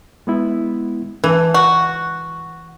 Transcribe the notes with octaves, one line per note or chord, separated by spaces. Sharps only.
G#3 B3 E4
E3 B4 A5
C#2 F#4